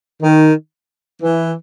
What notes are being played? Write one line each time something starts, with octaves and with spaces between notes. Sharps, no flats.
D#3
E3